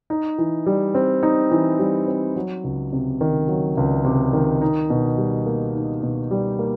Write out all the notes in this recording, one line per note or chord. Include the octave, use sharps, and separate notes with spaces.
D#4
E3
G3
C4
D#4
E3
G3
C4
F#3
C#2
C3
D#3
F#3
C#2
C3
D#3
D#4
B2
G3
A#3
D#4
B2
G3
A#3